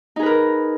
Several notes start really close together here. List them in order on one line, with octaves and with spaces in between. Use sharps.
D#4 G#4 B4 A#4